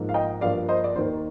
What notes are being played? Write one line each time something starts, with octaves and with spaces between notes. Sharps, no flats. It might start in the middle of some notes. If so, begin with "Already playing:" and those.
Already playing: G#2 F3 A#3
F5
D#5 G5
G2 F3 A#3 D5 F5
C5 D#5
D5
D#2 D#3 A#3 C5